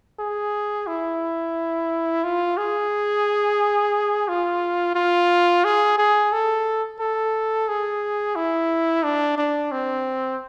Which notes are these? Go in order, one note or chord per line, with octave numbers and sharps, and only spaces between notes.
G#4
E4
F4
G#4
F4
F4
G#4
G#4
A4
A4
G#4
E4
D4
D4
C4